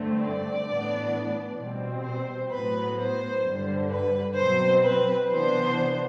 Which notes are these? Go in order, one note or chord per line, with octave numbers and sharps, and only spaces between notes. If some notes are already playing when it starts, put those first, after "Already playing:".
Already playing: G2 D3 A3 C4
D5
A2 E3 B3 D4
B2 G3 C4
C5
A2 F#3 B3 B4
C5
G2 D3 G3
B4
B2 F#3 C4 C5
B4
C3 E3 B3 D4 C5